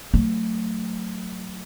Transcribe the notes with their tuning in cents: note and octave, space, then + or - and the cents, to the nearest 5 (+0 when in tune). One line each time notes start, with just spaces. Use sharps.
F#3 +0 A3 +20